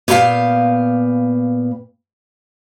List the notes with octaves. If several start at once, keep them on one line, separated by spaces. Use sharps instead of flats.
A#2 B3 G4 A4 F5 G5